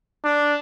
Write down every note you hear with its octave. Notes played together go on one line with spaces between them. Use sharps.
D4